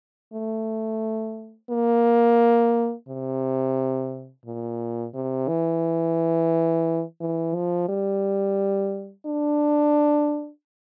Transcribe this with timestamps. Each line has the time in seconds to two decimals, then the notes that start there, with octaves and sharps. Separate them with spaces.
0.33 A3
1.70 A#3
3.08 C3
4.45 A#2
5.14 C3
5.48 E3
7.20 E3
7.54 F3
7.89 G3
9.26 D4